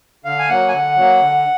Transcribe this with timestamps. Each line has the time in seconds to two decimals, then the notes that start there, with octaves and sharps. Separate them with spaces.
0.25 D3 F5
0.39 G#5
0.49 F#3 A#3 F#5
0.68 G#5
0.72 D3 F#5
0.96 F#3 A#3
1.21 D3